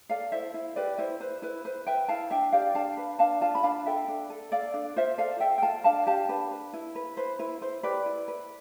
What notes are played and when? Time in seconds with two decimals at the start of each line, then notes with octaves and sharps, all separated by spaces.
0.10 A4 D5 F5
0.32 E4 C5 E5
0.54 E4
0.76 G4 B4 D5
0.98 E4 C5 E5
1.20 B4 C5
1.42 E4 B4
1.65 B4 C5
1.87 B4 E5 G5
2.08 E4 F5 A5
2.31 D4 E5 G5
2.52 G4 D5 F5
2.75 D4 F5 A5
2.97 B4
3.19 D4 F5 A5
3.41 F4 F5 A5
3.55 B5
3.63 D4 F5 A5
3.86 A4 E5 G5
4.08 D4
4.30 A4
4.52 A4 D5 F5
4.74 D4
4.96 F4 C5 E5
5.18 A4 D5 F5
5.40 A4 E5 G5
5.58 G5
5.62 F4 F5 A5
5.84 D4 F5 A5
6.07 G4 F5 A5
6.29 D4 B4
6.51 B4
6.73 E4
6.95 B4
7.17 B4 C5
7.39 E4 B4
7.61 E4 C5
7.83 G4 B4 D5
8.06 E4
8.28 B4